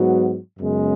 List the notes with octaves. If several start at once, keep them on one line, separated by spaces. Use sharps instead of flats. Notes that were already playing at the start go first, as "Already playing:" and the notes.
Already playing: G#2 F#3 B3 F#4
F#2 C#3 G#3 B3